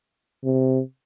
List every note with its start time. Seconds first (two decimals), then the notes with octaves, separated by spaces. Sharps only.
0.44 C3